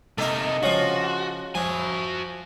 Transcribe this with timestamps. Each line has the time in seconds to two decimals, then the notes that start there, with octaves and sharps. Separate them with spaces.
0.18 C3 A#3 D#4 A4 A#4 D#5
0.63 C#3 F3 F4 F#4
1.55 F3 F#4 G#5